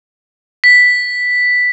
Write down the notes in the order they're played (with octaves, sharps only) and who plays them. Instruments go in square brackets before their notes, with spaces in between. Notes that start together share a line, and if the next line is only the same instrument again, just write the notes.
[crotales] B6